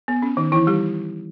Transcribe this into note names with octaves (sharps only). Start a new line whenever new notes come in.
B3
C#4
D#3 D#4
E3 E4
G3 G4